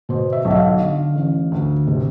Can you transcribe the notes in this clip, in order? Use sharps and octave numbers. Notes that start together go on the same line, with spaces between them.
B2 C5
E5
B1
E5
F5
D3
A1
D2
C3